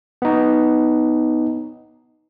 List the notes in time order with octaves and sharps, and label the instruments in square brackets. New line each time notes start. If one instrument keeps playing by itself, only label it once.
[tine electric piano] B3 D#4